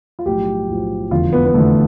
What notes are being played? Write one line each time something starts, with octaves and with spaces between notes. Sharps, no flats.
F4
B1 A2 F3 G4
B1 A2 F3
F1 E2 D3 F4
B3
B3
F1 E2 D3 A3